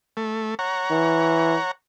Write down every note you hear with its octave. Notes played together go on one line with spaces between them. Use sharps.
A3
C#5 F#5 A#5
E3